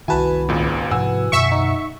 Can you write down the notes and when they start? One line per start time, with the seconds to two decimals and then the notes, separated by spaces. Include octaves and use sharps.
0.08 C2 D#3 E4 F#4 B4 G#5 A5 B5
0.49 G#1 C#2 A#2
0.91 G#2 C3 F3 F#5 G#5 E6
1.32 F#2 B2 D3 E5 C#6
1.52 D#4